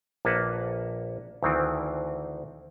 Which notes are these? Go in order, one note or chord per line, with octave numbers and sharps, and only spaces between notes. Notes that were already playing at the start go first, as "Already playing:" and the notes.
A#1 A#3 B4 F#5 A5
D2 D#3 E3 C4